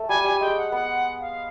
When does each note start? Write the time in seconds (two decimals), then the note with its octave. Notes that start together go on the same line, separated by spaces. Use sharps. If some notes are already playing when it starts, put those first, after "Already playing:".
Already playing: A3
0.08 G3 G#5
0.24 G3 G#5
0.41 G#3 G5
0.57 F#5
0.72 B3 F#5
1.20 F5